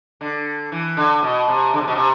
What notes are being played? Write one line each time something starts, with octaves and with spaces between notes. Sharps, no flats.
D3
E3
D3
B2
C3
D3
C3
B2
C3